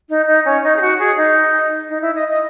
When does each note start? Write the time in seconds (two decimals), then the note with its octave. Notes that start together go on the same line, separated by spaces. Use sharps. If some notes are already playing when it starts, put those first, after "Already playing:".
0.09 D#4
0.27 D#4
0.45 C#4
0.63 D#4
0.76 G#4
0.81 F#4
0.98 G#4
1.17 D#4
1.88 D#4
2.01 E4
2.15 D#5
2.29 D#5